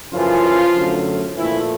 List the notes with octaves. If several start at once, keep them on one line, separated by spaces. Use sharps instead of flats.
F#2 C#3 E3 F3 F4
F#2 D3 F#3 A3
A#2 E3 F3 A3 E4